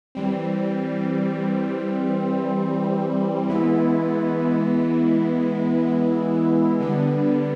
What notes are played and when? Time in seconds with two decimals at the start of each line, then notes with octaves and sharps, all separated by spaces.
0.15 E3 G3 C4
3.48 E3 G#3 B3 E4
6.80 D3 G3 B3 D4